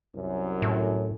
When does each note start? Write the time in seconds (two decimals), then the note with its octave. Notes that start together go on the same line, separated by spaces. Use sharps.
0.16 C2 F#2
0.62 A2